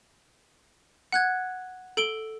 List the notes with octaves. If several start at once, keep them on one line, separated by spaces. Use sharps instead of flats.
F#5 F#6 G#6
A4 D7 G7